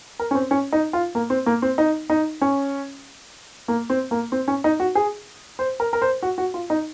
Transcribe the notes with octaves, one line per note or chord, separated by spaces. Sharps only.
A#4
C#4
C4
C#4
D#4
F4
A#3
C4
A#3
C4
D#4
D#4
C#4
A#3
C4
A#3
C4
C#4
D#4
F#4
G#4
C5
A#4
A#4
C5
F#4
F#4
F4
D#4